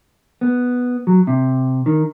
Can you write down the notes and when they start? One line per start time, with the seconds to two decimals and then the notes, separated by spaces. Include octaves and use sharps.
0.41 B3
1.07 F#3
1.27 C3
1.86 D#3